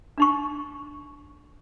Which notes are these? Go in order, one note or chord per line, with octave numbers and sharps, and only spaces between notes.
D4 D#4 C#6